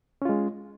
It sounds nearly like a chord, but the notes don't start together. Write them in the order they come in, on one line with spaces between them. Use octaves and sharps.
C#4 F4 G#3